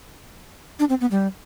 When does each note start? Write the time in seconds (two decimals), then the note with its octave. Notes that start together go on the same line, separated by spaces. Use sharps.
0.79 D4
0.89 C4
1.01 B3
1.11 G3